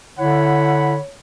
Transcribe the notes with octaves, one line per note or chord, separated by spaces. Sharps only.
D3 E4 C#5 F#5 B5